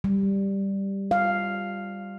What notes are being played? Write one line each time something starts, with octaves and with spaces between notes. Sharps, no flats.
G3
F5